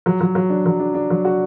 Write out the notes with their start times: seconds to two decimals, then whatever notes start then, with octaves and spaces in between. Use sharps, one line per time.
0.06 F#3
0.21 F#3
0.35 F#3
0.50 D4
0.66 F#3
0.80 D4
0.94 D4
1.10 F#3
1.25 F#4